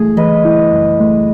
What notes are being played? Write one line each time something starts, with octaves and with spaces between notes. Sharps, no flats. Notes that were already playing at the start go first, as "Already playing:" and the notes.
Already playing: F#2 E3 A3 E4 G#4
E3 B4 D#5
E4
F#2
A3